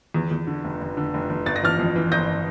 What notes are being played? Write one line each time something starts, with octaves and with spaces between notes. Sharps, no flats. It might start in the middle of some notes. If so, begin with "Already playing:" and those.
E2
E2
D3
F1
F1
D3
F1
F1
G1 A6
A#6
E3 F6 A6
F2
E3
G1 G6 A#6